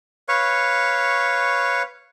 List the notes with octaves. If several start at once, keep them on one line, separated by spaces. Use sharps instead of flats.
B4 C#5 F5 C#6